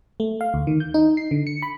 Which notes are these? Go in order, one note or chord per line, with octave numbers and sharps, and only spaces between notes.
A3
F5
D2
D#3
G6
D#4
C7
D3
C#7
B5